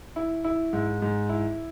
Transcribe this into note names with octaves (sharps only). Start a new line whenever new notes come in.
E4
E4
G#2
G#2
E4